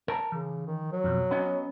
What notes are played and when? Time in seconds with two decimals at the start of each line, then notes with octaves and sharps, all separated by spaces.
0.08 A#4 A5 A#5
0.32 C#3 E3
0.67 D#3
0.92 F#3
1.04 B1 F2
1.31 B3 C#4 D#5